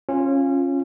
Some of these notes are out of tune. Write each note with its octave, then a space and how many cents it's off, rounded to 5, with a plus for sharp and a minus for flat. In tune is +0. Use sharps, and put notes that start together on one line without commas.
C#4 -20 F4 +0